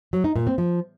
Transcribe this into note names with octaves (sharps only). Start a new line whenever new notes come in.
F#3
D#4
A#2
C4
F3